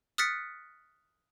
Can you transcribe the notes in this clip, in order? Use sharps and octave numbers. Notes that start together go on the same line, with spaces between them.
D#6 F6 F#6 A6 B6 C#7